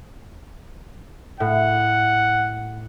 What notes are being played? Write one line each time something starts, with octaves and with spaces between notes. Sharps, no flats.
A2 F#5